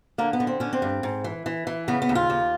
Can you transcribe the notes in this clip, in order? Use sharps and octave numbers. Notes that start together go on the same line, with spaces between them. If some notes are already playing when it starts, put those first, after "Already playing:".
D3 A#3
B3
D3
C4
D3 C#4
C4
G2
G#2
E3
E3
E3
C#3 B3
B3
D#2
F4
D#2